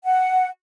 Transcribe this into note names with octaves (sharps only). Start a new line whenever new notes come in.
F#5